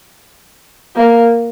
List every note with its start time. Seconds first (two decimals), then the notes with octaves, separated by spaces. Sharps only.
0.96 A#3